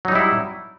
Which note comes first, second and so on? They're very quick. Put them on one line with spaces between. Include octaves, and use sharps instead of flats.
F#3 D#4 G3 E4